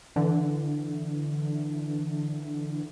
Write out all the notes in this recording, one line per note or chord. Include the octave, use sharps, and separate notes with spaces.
D3 E3